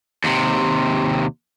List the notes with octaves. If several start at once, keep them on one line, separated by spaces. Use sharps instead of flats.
D#2 C3